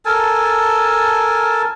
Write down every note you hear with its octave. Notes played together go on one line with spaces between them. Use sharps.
A4 A#4 G#5 A5